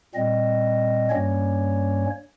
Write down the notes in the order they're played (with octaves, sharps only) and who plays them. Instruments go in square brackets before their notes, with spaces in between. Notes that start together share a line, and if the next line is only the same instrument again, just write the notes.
[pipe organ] A#2 G3 C4 D#5
G2 G3 A#3 C#4 C#5